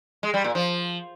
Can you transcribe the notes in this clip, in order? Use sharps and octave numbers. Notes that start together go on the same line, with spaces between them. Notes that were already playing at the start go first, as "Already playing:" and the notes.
G#3
G3
A#2
F3